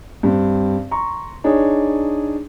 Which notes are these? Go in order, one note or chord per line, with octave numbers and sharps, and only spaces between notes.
G2 C4
A#5 C6 C#6
D4 D#4 G#4 C#5